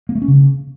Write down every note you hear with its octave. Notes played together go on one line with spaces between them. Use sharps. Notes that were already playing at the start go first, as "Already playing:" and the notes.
A#3
A3
C#4
C#3